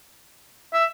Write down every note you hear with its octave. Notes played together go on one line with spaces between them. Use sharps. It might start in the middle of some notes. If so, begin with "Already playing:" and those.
E5